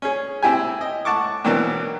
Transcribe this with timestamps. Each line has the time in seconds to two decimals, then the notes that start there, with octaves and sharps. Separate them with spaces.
0.02 C#4 G#4
0.43 C4 E4 G4 G#5
0.81 D#5
1.05 F#5 A5 C#6 D6
1.44 B2 E3 F#3 A#3 C4 D4